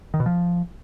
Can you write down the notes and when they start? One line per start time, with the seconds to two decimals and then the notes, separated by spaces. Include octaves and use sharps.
0.14 D#3
0.20 B2
0.26 F3